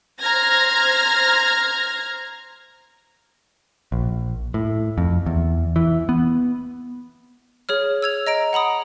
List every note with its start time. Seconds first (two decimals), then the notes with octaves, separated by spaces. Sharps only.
0.21 C5 A#5 F6 G#6 A#6
3.92 A#1
4.54 A2
4.98 F2
5.26 E2
5.76 E3
6.09 B3
7.69 G#4 C#5 F6
8.02 E6 G#6 F7
8.27 D#5 A#5 D7
8.53 F#5 A#5 B5 D#6